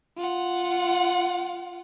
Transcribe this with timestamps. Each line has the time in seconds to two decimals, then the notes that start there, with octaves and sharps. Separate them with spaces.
0.18 F4 F#5